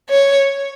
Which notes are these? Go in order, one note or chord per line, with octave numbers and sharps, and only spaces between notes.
C#5